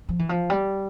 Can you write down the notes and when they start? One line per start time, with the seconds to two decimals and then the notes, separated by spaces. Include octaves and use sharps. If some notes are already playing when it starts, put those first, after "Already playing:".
0.09 F3
0.19 E3
0.29 F3
0.50 G3